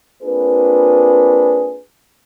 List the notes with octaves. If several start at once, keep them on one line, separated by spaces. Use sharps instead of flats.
A#3 C4 D4 F4 G#4 B4